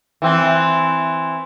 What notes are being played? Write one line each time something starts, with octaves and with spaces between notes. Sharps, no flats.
E3 C4